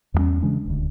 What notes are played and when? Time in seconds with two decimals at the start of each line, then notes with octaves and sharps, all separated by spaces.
0.14 E2 G2 G3 C#4
0.42 C#3 E3 G#3 D4
0.66 D#1 D2